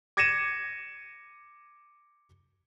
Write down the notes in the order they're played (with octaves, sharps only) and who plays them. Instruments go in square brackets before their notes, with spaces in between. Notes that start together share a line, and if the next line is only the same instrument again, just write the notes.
[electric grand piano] D6 G#6 A#6 C#7 D#7 E7